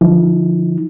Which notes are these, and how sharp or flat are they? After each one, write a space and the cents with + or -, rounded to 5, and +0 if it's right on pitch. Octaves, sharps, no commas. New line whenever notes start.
D3 +0 F3 -10 D#4 +30